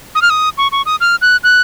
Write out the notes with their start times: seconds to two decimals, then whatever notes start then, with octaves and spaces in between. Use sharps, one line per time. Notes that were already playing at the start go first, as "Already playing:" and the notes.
0.15 D#6
0.22 F6
0.30 D#6
0.58 C#6
0.72 C#6
0.86 D#6
1.01 F6
1.22 F#6
1.44 F#6